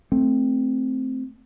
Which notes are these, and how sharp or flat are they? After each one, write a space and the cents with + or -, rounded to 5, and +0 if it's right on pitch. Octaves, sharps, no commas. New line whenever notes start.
A3 +0 C4 +0